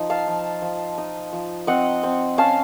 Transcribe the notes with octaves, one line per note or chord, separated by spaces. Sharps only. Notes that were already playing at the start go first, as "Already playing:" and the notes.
Already playing: F3 D#4
F5 A5
F3
F3
D#4
F3
C4 D#5 F#5
C4
C#4 F5 A5